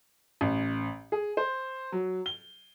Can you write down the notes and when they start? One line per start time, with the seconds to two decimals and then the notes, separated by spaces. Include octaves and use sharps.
0.41 A1
1.12 G#4
1.37 C5
1.92 F#3
2.26 G7